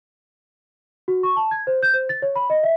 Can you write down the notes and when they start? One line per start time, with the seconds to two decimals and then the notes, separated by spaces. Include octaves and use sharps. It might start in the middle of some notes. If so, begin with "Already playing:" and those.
1.08 F#4
1.23 C#6
1.36 A5
1.51 G#6
1.67 C5
1.83 G6
1.94 C5
2.09 A6
2.22 C#5
2.36 B5
2.50 D#5
2.63 E5